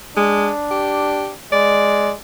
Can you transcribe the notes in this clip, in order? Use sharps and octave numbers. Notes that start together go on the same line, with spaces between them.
G#3 D4
G4
G#3 D5